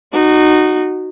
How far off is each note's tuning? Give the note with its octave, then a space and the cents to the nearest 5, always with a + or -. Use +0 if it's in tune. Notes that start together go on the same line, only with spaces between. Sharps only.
D#4 -20 F#4 +0